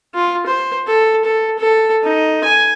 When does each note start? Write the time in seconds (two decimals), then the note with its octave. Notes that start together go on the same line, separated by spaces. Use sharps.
0.15 F4
0.47 C5
0.87 A4
1.25 A4
1.59 A4
2.04 D#4
2.44 G#5